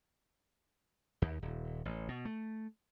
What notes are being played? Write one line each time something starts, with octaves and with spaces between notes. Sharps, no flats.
D#2
D#1
A1
B2
A3